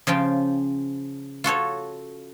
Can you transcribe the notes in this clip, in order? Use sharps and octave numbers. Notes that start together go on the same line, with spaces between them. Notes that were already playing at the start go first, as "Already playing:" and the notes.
C#3 F3 F4 G5
F4 F#4 A4 C#5